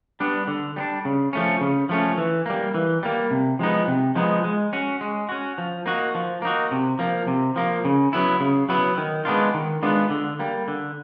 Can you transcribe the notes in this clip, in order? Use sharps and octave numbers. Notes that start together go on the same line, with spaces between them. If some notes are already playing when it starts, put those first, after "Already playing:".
G3 B3 D4
D3
G3 B3 D4
C#3
F3 A3 C#4
C#3
F3 A3 C#4
E3
G3 A#3
E3
G3 A#3
C3
F3 G#3 B3 D#4
C3
F3 G#3 B3 D#4
G#3
C#4 F#4
G#3
C#4 F#4
F3
A#3 D#4 F#4
F3
A#3 D#4 F#4
C3
F3 A#3
C3
F3 A#3
C#3
F#3 B3 E4
C#3
F#3 B3 E4
D#3
G#3 B3 D4 F4
D#3
G#3 B3 D4 F4
D3
G3 A#3
D3